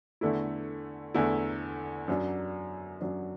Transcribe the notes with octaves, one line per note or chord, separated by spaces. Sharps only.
E2 D3 A3 E4
E2 D3 A3 E4
F#2 F#3 D4
F#2 F#3 D4